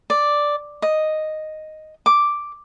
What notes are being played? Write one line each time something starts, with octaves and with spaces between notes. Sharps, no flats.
D5
D#5
D6